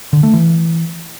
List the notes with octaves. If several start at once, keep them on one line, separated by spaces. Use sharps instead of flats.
D3
A3
E3